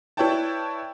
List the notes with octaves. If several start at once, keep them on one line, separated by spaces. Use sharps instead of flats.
E4 B4 C#5 D5 G5 A5